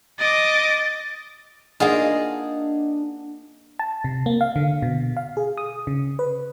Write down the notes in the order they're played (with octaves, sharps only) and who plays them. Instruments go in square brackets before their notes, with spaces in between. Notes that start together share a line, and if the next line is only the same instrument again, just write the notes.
[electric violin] D#5 D6 [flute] A6
[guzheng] A#3 D#4 F4 [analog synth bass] D4 [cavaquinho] G#4 [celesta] D#5 F#5
[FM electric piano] A5
C3
A#3
F5
D3
B2
F5
G#4
D#6
C#3
B4